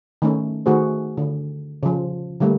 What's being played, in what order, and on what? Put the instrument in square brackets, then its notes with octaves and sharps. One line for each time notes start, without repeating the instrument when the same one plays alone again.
[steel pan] D#3 A3 C#4
D#3 A3 F#4 G#4 C5
D3
C#3 F3
D3 G3 A3 A#3